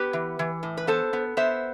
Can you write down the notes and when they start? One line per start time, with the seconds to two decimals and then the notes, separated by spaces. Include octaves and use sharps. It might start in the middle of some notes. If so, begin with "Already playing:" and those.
Already playing: B3 G4 B4
0.13 E3
0.39 E3
0.63 A2
0.77 B4
0.87 B3 A4 C5
1.13 B3
1.37 B3 C5 E5